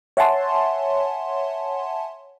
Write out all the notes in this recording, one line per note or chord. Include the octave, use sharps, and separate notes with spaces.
C#5 E5 F#5 G#5 A5 C6